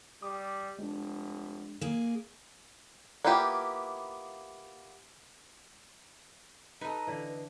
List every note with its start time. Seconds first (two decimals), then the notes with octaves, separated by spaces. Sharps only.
0.22 G3 D6 D#6
0.79 F1 G#3 D4
1.81 A#3 G#4
3.25 A#3 B3 E4 F4 G4
6.81 D#4 A4 B4 D#5 A#5
7.07 D3 E3
7.28 B4